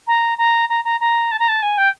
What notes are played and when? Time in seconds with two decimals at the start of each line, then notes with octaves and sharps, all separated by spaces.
0.07 A#5
0.38 A#5
0.69 A#5
0.84 A#5
1.00 A#5
1.31 A5
1.39 A#5
1.48 A5
1.62 G#5
1.77 G5